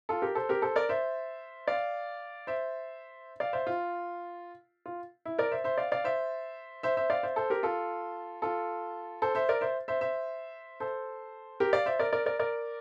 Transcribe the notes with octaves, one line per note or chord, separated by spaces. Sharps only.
F4 A4
G4 A#4
A4 C5
G4 A#4
A4 C5
A#4 D5
C5 E5
D5 F5
C5 E5
D5 F5
C5 E5
F4
F4
E4
A#4 D5
C5 E5
C5 E5
D5 F5
D5 F5
C5 E5
C5 E5
C5 E5
D5 F5
C5 E5
A4 C5
G4 A#4
F4 A4
F4 A4
A4 C5
C5 E5
A#4 D5
C5 E5
C5 E5
C5 E5
A4 C5
G4 A#4
D5 F5
C5 E5
A#4 D5
A#4 D5
A#4 D5
A#4 D5